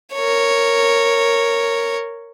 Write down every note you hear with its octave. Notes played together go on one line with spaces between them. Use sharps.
A#4 C#5